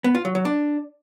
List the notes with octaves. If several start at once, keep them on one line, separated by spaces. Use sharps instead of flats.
B3
F4
F#3
F#3
D4